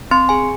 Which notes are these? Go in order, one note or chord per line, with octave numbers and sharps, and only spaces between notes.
C4 C6
G#4 G#5